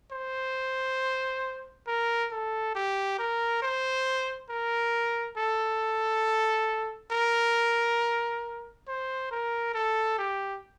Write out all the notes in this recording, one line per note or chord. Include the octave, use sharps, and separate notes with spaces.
C5
A#4
A4
G4
A#4
C5
A#4
A4
A#4
C5
A#4
A4
G4